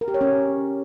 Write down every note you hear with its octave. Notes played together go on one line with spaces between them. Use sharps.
A#4
G4
C#5
C#4